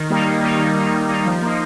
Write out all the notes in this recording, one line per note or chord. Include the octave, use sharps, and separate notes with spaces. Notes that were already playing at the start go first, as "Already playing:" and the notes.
Already playing: D#3
G3 A#3 D#4
D#3
G3 A#3 D#4
D#3
G3 A#3 D#4
D#3
G3 A#3 D#4
F3
A#3 D#4